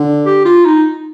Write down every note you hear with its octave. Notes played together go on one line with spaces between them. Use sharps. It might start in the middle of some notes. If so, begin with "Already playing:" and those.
Already playing: D3
G4
F4
D#4